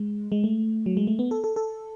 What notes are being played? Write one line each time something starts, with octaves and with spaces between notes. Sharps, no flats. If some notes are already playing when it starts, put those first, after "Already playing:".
Already playing: G#3
G#3
A3
F#3
G#3
A3
B3
A4
A4
A4